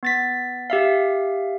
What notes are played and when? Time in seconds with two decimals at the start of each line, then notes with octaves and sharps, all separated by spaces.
0.03 B3 A6 B6
0.70 G4 E5 F5